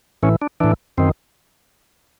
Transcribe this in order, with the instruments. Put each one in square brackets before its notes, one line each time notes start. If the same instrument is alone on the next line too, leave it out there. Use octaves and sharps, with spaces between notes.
[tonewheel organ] A2 E3 C#4
D4
A2 E3 D4
F#2 D#3 C4